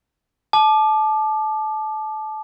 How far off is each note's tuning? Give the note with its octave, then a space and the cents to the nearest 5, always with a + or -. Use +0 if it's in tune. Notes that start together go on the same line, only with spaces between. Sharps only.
A5 -25 D6 +25